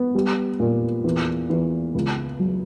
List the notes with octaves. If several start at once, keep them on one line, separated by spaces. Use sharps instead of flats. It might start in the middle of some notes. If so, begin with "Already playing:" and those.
Already playing: B3
G3
A#2
E2
E2
C#2
F#3